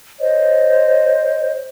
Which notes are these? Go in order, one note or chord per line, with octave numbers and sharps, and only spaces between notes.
C5 C#5 D#5